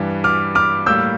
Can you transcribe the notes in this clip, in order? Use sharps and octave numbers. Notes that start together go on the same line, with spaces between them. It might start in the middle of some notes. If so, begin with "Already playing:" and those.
Already playing: G2 E3 G3
D6 F6
D6 F6
A2 G3 A#3 E6 G6